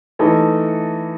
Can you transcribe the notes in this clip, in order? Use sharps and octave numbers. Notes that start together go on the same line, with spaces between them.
E3 A3 D#4 A4